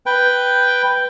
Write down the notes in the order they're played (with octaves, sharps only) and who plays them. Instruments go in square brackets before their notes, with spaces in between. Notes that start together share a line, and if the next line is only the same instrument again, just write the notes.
[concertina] B4 G5